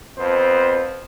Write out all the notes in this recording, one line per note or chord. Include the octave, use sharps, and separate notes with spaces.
F2 B3 C5